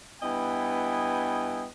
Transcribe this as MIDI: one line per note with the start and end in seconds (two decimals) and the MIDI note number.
0.21 1.65 43
0.21 1.65 59
0.21 1.65 64
0.21 1.65 75
0.21 1.65 79
0.21 1.65 80